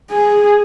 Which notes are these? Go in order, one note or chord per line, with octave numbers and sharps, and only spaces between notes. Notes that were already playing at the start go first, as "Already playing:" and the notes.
G#4